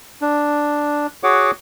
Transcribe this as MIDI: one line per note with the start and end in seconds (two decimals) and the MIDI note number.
0.22 1.07 62
1.23 1.51 66
1.23 1.51 68
1.23 1.51 73
1.23 1.51 78
1.23 1.51 86